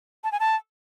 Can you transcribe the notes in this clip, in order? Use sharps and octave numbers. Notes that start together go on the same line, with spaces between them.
A5
G#5
A5